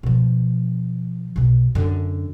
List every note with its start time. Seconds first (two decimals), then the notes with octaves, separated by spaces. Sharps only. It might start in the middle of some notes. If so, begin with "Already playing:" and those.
0.03 B2 F3
1.36 B1 B2
1.75 F#2 D3